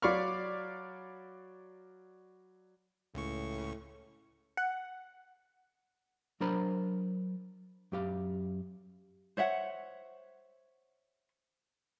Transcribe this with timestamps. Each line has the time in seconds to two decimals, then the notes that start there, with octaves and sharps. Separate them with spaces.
0.02 F#3 D5 F5 B5 C#6 F6
3.15 C#2 A2 C#3 C#6
4.57 F#5
6.40 F#3 D4 A#4 C5 A#5 B5
7.92 F#2 G4 F5
9.37 C5 C#5 E5 F#5